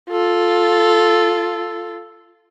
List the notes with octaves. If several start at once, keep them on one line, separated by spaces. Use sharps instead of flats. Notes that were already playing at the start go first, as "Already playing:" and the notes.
F4 A4